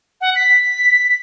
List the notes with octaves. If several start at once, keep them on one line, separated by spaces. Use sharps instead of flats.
F#5
B6